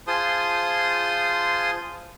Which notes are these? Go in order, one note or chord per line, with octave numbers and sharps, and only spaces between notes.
F4 G#4 C5 A5 C6 D#6